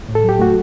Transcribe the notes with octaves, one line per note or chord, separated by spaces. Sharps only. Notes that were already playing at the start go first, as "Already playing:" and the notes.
A2
A4
F#3 G4
A3 F#4